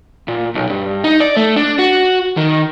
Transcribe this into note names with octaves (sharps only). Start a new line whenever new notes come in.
A#2
B1
G2
D#4
D5
A3
D4
F#4
D#3